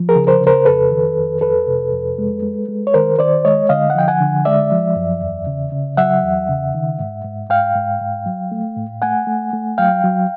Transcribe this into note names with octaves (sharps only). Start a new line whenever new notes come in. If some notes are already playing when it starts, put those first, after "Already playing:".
Already playing: F3
G#4 A#4
C#3
A#4 C5
C#3
A#4 C5
F2 A4 B4
D#3
F2
F2 A4 B4
C3
F2
G#3
G#3
G#3
C#5
D#3 A#4 C5
D#3 C5 D5
G#3 C#5 D#5
D3 D#5 F5
F#5
F3 G5
F#5 G#5
D3
G#3 D5 E5
F3
F#2
E2
C#3
C#3
F#3 E5 F#5
E2
C#3
D#3
G#2
G#2
G#2 F5 G5
G#2
G#2
F#3
A3
A2
A3 F#5 G#5
A3
A3
F#3 F5 G5
F#3